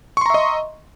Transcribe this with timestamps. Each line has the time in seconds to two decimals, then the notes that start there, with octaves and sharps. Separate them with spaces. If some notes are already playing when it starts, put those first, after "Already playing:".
0.17 C#6
0.21 C6
0.26 A#5
0.30 E5
0.34 D#5